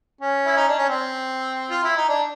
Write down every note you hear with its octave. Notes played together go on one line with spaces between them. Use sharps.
C#4
E4
D#4
D4
C#4
C4
F4
E4
D#4
D4